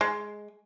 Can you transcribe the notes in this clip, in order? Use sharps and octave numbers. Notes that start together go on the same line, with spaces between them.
G#3